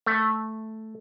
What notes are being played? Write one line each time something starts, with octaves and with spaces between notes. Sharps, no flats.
A3